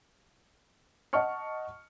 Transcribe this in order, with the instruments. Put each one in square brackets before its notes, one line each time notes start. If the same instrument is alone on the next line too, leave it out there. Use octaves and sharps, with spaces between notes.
[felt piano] D#5 F#5 A5 C#6 F6 C#7